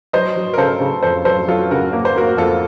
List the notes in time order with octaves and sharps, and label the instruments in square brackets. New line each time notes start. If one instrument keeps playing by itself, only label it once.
[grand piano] F#3 [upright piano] C5 D#5
[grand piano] F#3
[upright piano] A#4
[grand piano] C#3 [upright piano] A4 C5
[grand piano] C#3
[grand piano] F2 [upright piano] A4 C5
[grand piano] F#3 [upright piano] A4 C5
[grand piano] F#3 [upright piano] F4 A4
[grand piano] C#3 [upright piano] F#4 A#4
[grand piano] A#3 [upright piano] A#4
[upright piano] C5
[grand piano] A#3 [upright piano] F#4 A#4
[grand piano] F2 [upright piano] F4 A4